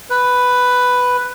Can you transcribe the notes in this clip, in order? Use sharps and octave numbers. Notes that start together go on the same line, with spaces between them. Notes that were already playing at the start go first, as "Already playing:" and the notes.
B4